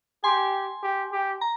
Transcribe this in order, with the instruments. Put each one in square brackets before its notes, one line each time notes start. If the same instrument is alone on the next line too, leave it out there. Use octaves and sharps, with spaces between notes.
[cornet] G4 [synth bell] G#5 C6
[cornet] G4
G4
[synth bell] A#5